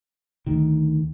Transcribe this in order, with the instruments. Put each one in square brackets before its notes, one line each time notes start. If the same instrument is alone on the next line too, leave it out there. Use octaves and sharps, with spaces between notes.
[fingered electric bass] D2 D#3